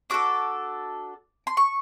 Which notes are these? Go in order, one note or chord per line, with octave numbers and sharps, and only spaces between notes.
D4 F#4 A4 D6
C6
C#6